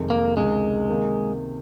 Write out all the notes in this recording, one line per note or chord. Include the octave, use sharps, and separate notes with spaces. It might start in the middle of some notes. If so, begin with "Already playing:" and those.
Already playing: F1 F2 C3 D#3 G#3
A#3
C#2 C3 D#3 G#3
C3 D#3 A#3